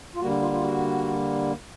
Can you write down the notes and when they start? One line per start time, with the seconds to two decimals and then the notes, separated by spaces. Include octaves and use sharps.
0.15 F4
0.21 D3 G3 A#3 F#4
0.41 F4
0.53 F4
0.63 F#4